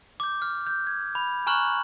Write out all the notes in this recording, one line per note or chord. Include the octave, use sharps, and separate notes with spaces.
D6 G6
F6
G6
G#6
B5
G#5 A#5 C#6 F6 F#6 F#7